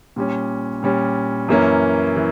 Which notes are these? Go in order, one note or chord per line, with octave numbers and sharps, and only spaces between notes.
A#2 G3 C#4
A#2 G3 C#4
F#2 E3 A#3 C#4
E3